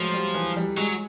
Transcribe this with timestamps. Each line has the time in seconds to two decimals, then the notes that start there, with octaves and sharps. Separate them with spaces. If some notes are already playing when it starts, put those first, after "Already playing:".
Already playing: F3 F#3 G#3 A3
0.14 G3
0.34 E3
0.56 G3
0.77 F#3 G#3